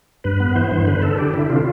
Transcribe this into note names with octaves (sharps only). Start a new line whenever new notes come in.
G2 B4
B3
E3 C5
G2 C5
D3 B4
D3 A4
D3 G4
D3 E4
C3 F4